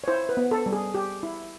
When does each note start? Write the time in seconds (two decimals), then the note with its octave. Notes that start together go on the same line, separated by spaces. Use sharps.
0.04 C#5
0.08 E4 C5
0.29 B4
0.37 B3
0.51 A4
0.66 G3
0.73 G#4
0.94 G4
1.23 E4